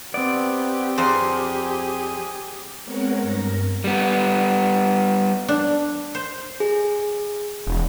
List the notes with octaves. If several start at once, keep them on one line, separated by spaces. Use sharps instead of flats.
B3 C4 G4 D5
F2 G#4 C5
G#3 B3 C4 A#4 C#5 F#5
G2 A#4 A#6
G3 B3
D4
C5
G#4
E1